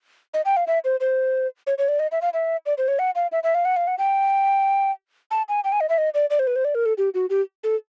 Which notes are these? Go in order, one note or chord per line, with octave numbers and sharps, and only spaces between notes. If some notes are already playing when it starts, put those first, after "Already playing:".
D#5
G5
F5
E5
C5
C5
C#5
C#5
D5
D#5
E5
F5
E5
D5
C5
C#5
F#5
F5
E5
E5
F5
F#5
F5
F#5
G5
A5
G#5
G5
G#5
D#5
E5
D#5
D5
D5
C5
B4
C5
D5
A#4
A4
G4
F#4
G4
A4